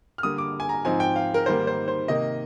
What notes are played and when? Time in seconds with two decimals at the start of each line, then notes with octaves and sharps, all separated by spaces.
0.18 F6
0.23 D3 G3 A#3 D#6
0.38 D6
0.60 G#5
0.69 A#5
0.85 G#2 F3 C4 D#4 G#5
1.00 G5
1.16 F5
1.34 A#4
1.46 G#2 D#3 G3 A#3 C5
1.67 C5
1.88 C5
2.08 C3 D#3 A#3 D#5